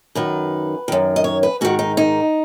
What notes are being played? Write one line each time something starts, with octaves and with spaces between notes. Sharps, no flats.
F#2 D#3 B4
F#2 D#3
D#5
C#5
B4
G#2 D#3 F#4
D#4
D#4